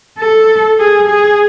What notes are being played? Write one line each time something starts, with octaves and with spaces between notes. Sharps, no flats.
A4
G#4
G#4